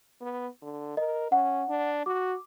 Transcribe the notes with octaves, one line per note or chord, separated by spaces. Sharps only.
B3
D3
A#4 D#5
C#4 F#5
D4
F#4 D6